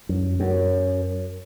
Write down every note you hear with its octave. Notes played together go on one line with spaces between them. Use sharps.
F#2
F#2